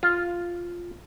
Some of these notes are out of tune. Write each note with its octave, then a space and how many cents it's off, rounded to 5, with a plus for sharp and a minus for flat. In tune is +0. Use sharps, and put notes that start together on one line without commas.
F4 +0